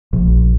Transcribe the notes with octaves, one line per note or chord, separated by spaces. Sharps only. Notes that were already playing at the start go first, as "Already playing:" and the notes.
A#1